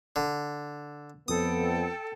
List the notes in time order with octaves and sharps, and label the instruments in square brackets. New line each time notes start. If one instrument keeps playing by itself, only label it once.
[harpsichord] D3
[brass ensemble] F2 B3 [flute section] A4 G5 [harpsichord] D#6